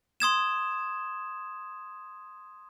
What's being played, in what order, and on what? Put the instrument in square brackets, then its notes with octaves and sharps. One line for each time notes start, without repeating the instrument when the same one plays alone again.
[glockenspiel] C6 D#6 G#6 E7